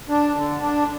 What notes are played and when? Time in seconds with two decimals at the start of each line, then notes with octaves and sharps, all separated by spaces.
0.09 D4
0.35 D3
0.60 D4